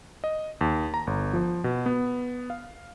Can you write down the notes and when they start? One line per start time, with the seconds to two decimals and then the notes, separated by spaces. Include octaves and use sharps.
0.24 D#5
0.61 D#2
0.94 A#5
1.07 G1
1.33 F3
1.64 B2
1.86 B3
2.50 F5